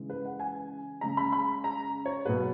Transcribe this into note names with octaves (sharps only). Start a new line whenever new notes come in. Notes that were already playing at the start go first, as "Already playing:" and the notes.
Already playing: C#3 E3 G#3
B4
F#5
G#5
C#3 G#3 A#5
B5
B5
A#5
C#5
B2 F#3 B4